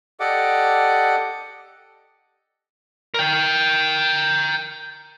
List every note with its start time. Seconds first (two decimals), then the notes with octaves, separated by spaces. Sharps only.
0.20 G4 A4 D5 D#5 F#5 D6
3.14 A#4 G5